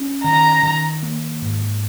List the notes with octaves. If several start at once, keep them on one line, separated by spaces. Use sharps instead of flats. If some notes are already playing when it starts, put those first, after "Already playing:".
Already playing: C#4
D#3 A#5
D#3
A#3
G#2